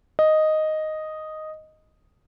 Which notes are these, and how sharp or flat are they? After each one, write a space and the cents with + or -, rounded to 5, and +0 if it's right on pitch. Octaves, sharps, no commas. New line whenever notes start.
D#5 +0